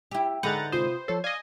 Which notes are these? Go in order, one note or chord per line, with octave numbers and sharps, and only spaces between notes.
E4 G4
G#2 D3 G#3 B4 F#5 A#5 G6 A6
C3 F4 C5 D#6
F3 A4 C#5 C7
D5 D#5 F5 G#5